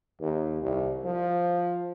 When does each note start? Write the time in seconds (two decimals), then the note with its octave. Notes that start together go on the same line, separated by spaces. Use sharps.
0.21 D#2
0.62 C2
1.05 F3